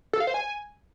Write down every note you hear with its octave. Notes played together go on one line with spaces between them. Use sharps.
A4
F5
C5
G#5